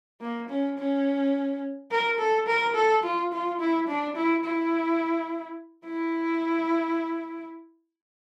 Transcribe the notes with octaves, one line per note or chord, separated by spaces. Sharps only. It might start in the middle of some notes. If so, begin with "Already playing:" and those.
A#3
C#4
C#4
A#4
A4
A#4
A4
F4
F4
E4
D4
E4
E4
E4